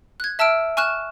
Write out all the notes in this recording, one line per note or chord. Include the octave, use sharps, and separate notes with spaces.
F#6 G#6
E5 A5 E6 F6 D7
G#5 C#6 F6 F#6 E7